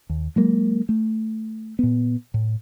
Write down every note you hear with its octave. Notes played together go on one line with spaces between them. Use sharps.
D#2
F#3 G#3 A#3
A3
A#2 B3
A2